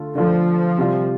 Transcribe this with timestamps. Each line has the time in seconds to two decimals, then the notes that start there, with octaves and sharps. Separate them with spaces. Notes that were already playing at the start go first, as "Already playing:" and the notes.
Already playing: D3 A3 F4 A4
0.15 D3 F3 A3 F4 A4
0.78 C3 G3 F4